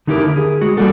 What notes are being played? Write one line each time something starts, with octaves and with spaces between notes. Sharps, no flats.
D3 D#4 E4 G4 G#4 A#4
G#4
G#3 F#4
G3 A#3 D4 F#4 A4